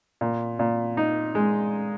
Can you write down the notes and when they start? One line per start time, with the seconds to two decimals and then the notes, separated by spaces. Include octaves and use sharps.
0.21 A#2
0.59 A#2
0.97 D#4
1.35 G#3